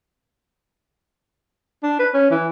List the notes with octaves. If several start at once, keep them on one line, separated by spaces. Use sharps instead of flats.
D4
B4
C#4
E3